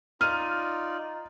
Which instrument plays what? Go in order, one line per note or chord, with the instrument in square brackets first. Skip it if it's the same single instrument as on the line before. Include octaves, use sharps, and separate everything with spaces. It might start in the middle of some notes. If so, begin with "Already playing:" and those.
[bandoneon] D#4 F4 D5 [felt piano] F6 D#7